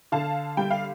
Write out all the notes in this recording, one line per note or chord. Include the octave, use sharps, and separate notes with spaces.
D3 F5 A5
G3 G5
F5